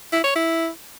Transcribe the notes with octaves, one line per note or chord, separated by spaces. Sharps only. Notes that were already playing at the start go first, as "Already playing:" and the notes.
E4
C#5
E4